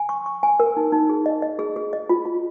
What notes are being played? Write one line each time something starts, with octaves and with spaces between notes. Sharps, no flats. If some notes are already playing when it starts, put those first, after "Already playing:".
Already playing: G#5
C#6
C#6
G#5
A#4
D#4
D#4
G#4
D#5
D#5
G#4
G#4
D#5
F4
F4